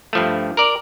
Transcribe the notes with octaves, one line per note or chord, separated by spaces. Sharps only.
G2 F3 A3
A#4 D5